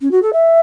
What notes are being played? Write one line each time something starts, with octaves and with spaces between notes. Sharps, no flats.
C#4
F#4
A4
E5